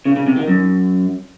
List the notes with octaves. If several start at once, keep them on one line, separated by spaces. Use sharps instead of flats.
C#3
C#3
C3
D#3
F#2